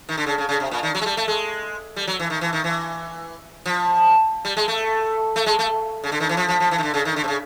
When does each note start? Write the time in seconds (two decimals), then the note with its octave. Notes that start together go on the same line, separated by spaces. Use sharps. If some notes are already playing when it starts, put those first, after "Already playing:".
0.09 D#3
0.18 D3
0.26 C#3
0.38 C#3
0.49 C#3
0.60 C3
0.71 A#2
0.83 D#3
0.95 F#3
1.01 G#3
1.06 G3
1.17 A3
1.28 G#3
1.96 G3
2.08 F#3
2.20 E3
2.30 D#3
2.41 E3
2.53 D#3
2.64 E3
3.66 F3
4.45 G3
4.57 G#3
4.68 A3
5.36 A3
5.46 G#3
5.59 A3
6.04 C#3
6.12 D3
6.20 D#3
6.29 E3
6.37 F3
6.48 F3
6.60 F3
6.71 E3
6.78 D#3
6.83 D3
6.94 C#3
7.05 D#3
7.16 D3
7.24 C3
7.28 C#3